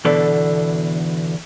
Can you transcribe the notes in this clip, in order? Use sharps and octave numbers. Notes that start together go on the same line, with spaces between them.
E2 B2 D3 A4 D5